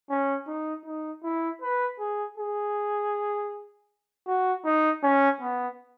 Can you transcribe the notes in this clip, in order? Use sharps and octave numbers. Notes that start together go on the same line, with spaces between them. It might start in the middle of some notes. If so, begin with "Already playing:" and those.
C#4
D#4
D#4
E4
B4
G#4
G#4
F#4
D#4
C#4
B3